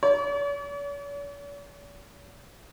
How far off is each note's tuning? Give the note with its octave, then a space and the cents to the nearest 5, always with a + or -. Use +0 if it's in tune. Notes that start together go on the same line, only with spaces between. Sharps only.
C#5 +45